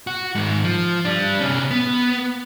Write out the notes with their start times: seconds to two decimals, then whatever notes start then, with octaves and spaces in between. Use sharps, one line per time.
0.07 F#4
0.35 G#2 D#3
0.64 F3
1.05 G3 D4
1.41 C3 C#4
1.71 B3